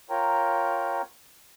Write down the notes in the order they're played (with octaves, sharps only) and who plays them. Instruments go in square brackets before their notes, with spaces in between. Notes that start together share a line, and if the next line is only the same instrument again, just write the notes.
[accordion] F4 A#4 C#5 G5 A#5